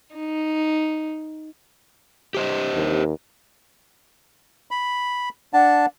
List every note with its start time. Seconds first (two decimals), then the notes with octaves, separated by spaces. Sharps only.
0.15 D#4
2.34 G4 C5 D#5
2.74 D#2
4.71 B5
5.53 D4 F#5 A5